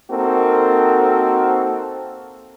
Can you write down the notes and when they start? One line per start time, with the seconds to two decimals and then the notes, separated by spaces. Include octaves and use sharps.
0.10 A#3 C4 D#4 F#4 A4 A#4